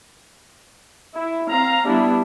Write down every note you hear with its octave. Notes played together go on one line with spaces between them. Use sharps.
E4
C4 F5 A#5
G3 B3 D4 E4